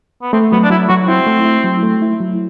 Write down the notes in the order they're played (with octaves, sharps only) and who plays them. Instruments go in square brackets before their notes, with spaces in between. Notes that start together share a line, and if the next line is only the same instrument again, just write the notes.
[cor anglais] B3
[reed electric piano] A3 [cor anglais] C4
[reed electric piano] F#3 [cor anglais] B3
[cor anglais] D4
[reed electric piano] F#3 [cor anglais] E4
[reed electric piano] F#3 [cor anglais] F#4
[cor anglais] C4 [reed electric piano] E4
[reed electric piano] A3
E4
F#3
A3
E4
F#3